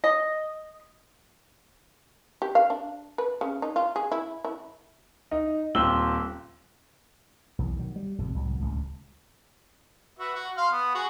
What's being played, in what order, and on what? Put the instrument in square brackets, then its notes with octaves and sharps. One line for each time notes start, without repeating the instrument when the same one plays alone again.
[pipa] D#5
[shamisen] G4
F5
D4
B4
C#3
D#4
F4
G#4
E4
E4
[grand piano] D#4
D#1 C4 F4 E6 G7
[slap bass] B1 E2
D#3 F#3
G3
G#1 F2 C3
C2 A2 F#3
D1 C#2
[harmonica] F#4 B4 E5
F#4
F5 C6
B3
F#4 G#4